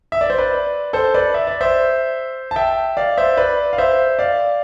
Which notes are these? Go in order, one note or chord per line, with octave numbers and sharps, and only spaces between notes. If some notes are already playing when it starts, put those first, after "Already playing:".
E5
D5
C5
B4 D5
A4 C5
B4 D5
E5
D5
C5 E5
A5
E5 G5
D5 F5
C5 E5
B4 D5
F5
C5 E5
D5 F5